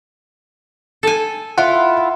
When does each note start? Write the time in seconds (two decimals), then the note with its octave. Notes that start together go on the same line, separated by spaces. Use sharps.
1.03 A4 G#5
1.58 E4 F4 F#5